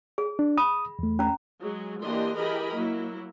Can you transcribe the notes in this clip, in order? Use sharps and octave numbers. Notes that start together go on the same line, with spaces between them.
G#4
D4
B5 D#6
E2 A3
C#4 A#5
F#3 G#3 G#4
E3 A#3 D4 G4 D#5 C6
E3 G4 G#4 A#4 D#5 B5
F#3 A#3 E4